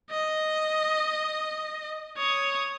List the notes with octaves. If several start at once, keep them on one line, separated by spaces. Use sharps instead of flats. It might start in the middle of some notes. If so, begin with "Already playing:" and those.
D#5
C#5 D#6